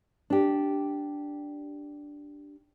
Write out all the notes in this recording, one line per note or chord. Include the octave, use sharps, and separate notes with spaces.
D4 G4